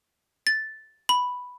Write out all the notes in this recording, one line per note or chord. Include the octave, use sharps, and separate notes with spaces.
A6
B5